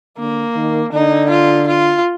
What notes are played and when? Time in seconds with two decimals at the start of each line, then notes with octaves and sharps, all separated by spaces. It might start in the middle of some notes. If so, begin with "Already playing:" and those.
0.18 D3 A#3
0.56 D#3
0.93 D3 D#4
1.30 F4
1.68 F4